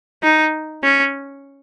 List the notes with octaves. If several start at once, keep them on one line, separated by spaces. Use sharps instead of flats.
D#4
C#4